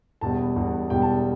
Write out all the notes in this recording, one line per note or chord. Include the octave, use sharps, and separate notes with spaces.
E1 E2 B2 G3 A5
E1 E2 B2 G3
E1 E2 B2 G3 G5
A5